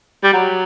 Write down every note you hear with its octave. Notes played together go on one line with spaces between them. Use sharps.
G3
F#3